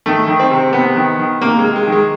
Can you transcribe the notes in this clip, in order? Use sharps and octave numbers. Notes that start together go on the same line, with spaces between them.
D#3 A3
D#3
C4
C3
C3 B3
D#3
D#3
C3 A#3
G#3
C3
G#3
D#3
G#3